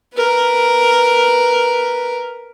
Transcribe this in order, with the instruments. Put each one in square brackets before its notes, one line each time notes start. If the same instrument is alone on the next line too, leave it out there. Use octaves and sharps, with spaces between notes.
[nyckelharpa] A#4 B4